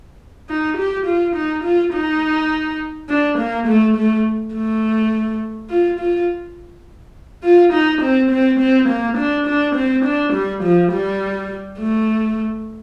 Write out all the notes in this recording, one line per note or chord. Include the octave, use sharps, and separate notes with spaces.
D#4
G4
F4
D#4
F4
D#4
D4
A#3
A3
A3
A3
F4
F4
F4
D#4
C4
C4
C4
A#3
D4
D4
C4
D4
G3
F3
G3
A3